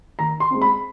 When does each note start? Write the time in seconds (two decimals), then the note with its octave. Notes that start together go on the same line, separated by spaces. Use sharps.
0.19 D#3 A#5
0.40 C6
0.51 G#3 C4
0.62 B5